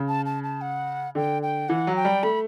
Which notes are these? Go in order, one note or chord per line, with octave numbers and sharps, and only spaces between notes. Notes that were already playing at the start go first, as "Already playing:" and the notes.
Already playing: C#3
A5
A5
A5
F#5
D3 G5
G5
E3 F#5
F#3
G5
G3
A3 B5